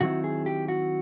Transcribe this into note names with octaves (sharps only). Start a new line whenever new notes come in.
D#3 F#3 A3 C4 E4 F#4
G#4
G4
F#4